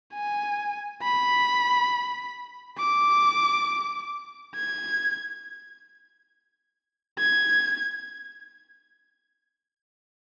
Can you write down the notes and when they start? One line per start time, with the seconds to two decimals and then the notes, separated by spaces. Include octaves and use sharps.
0.14 G#5
1.03 B5
2.79 D6
4.55 G#6
7.19 G#6